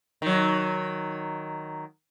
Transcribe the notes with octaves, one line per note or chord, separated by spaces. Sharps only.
D#3 F#3